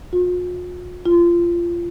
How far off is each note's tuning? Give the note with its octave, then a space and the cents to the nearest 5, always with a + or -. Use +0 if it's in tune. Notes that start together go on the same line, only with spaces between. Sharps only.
F4 +45
F4 -20